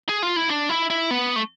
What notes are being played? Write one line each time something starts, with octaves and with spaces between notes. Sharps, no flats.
G#4
F4
E4
D4
E4
E4
B3
A3